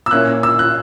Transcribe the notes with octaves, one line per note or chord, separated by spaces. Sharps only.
E6
A#2 A#3 C#4 E4 F#6
E6
F#6